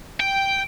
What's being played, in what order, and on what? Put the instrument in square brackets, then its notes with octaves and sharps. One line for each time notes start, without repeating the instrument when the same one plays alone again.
[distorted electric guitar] G5